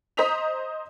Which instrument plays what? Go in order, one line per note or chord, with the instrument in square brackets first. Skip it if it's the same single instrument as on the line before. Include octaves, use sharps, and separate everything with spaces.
[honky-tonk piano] C5 D#5 A#5 D#6 B6 F7